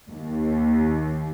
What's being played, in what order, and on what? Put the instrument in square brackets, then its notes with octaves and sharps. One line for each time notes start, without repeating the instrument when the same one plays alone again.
[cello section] D#2